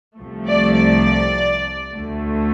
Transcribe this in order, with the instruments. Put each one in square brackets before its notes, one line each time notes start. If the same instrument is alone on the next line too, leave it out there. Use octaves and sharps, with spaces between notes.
[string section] C2 C3 F3 A3
D5
D5
D2 D3 A3